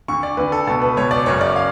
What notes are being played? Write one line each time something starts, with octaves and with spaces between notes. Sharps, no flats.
D2 D3 C#6
D5
D2 D3 B4
A4
C#2 B2 A4
B4
C#2 B2 C#5
D5
F#1 F#2 C#3 C#5
D5
F5